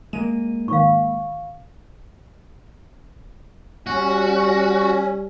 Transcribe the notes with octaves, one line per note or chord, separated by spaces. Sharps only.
G#3 A#3 D#7
G#2 D#3 F5 C#6
G3 C#4 F#4